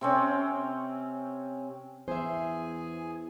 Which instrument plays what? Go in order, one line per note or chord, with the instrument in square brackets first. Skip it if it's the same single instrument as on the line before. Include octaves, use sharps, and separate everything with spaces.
[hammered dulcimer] C3 C4 C#4
[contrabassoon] E2 [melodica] G#4 G#5 [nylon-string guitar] C5 E5